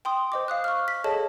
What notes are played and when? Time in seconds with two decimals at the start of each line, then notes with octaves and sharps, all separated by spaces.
0.05 G5 C6 D#6
0.32 C5 D#5 D6
0.48 F5 D#6 F#6
0.64 C#6 F6
0.88 B6
1.04 G#4 A4 C#5 D#5 A5